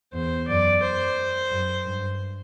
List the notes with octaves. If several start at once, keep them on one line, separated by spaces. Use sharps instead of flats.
E2 C5
F#2 D5
C5
F#2
G2